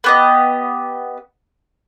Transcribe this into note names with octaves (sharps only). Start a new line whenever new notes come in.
B3 G4 D#5